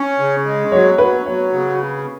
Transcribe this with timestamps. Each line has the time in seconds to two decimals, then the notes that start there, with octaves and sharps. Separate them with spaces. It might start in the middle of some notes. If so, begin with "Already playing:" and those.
Already playing: C#4
0.19 C#3
0.46 G#3
0.72 F#3 C#5
0.98 F#3 B4
1.26 F#3 C#5
1.53 C#3